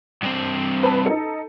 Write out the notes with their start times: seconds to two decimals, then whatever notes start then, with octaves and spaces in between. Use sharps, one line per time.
0.23 G2 C4
0.83 B4 A5
1.06 D#4 A4